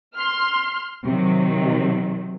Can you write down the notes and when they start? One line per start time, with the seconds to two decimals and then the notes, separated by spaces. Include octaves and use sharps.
0.15 C6 F6
1.05 C3 D#3 F#3